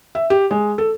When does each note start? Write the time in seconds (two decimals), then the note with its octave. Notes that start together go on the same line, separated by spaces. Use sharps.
0.15 E5
0.30 G4
0.51 G#3
0.78 A4